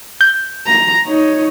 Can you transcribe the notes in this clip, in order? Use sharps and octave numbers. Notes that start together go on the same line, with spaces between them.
G6
A#5
D#4 C#5